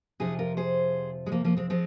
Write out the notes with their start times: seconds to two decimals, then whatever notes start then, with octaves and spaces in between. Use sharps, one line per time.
0.20 F2 C3 F3 D#4 G#4
0.39 F4 A#4
0.57 G#4 C5
1.26 G#3
1.32 F3 A#3
1.44 F3 A#3
1.57 G#3 C4
1.70 F3 G#3 C4